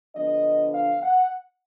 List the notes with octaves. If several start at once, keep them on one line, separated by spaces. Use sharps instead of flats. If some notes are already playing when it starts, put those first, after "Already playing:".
D3 F3 B3 D4 D#5
F5
F#5